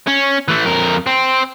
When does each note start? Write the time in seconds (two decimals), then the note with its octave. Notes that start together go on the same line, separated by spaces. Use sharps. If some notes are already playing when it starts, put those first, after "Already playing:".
0.07 C#4
0.48 E3 A3
0.66 F2 A#4
1.07 C4